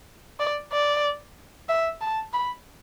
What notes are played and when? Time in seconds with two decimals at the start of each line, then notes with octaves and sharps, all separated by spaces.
0.40 D5
0.72 D5
1.69 E5
2.01 A5
2.33 B5